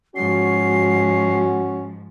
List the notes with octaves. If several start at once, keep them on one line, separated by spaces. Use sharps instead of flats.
G#2 F3 C#4 F#4 C7